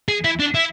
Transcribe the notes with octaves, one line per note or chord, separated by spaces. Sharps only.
G#4
E4
D4
E4